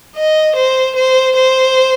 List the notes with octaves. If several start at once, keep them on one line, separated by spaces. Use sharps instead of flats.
D#5
C5
C5
C5